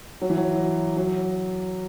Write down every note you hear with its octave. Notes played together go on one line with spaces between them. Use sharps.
F#3
E3
F#3
F#3